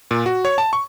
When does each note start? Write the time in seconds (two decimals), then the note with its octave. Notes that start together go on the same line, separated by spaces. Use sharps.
0.11 A#2
0.26 F#4
0.45 C#5
0.58 A5
0.73 C#6